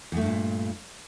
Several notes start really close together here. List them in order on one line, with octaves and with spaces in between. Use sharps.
E2 A3 G2 A#2